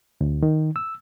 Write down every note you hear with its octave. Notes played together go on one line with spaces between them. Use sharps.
D2
D#3
E6